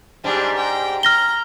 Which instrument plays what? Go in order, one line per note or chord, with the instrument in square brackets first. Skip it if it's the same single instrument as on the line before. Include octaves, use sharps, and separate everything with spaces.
[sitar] G#2 G3 [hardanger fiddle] D4 G#4
[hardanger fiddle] G5 A#5
[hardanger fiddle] A#5 [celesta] F6 A#6 G7